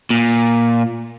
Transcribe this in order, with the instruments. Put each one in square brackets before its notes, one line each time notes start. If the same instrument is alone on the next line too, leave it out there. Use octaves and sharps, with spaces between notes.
[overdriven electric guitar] A#2